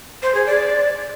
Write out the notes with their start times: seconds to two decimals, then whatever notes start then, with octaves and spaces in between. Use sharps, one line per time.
0.23 C5
0.34 G#4
0.46 D5